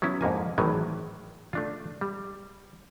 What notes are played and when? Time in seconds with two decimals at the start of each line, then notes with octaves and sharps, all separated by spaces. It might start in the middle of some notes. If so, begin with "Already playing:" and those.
0.02 F#3 B3 C#4 E4
0.21 F2 G#2 A#3 G#5
0.58 G#1 A2 D#3 E3 F#3 G#5
1.53 A3 D4 F4
2.01 G3